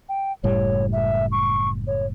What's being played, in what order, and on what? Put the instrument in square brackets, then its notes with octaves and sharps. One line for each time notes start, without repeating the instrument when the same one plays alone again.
[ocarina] G5
[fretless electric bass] F#1 A2 G3 [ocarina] C#5
[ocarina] E5
C#6
C#5